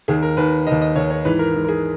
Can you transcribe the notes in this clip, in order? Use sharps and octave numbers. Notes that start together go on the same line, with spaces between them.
D#2 D#3 G#4
A#4
D#2 D#3 B4
D#2 D#3 D#5
D#5
D#2 D#3 C#5
C#5
G#2 E3 B4
A#4
G#2 E3
A#4
G#4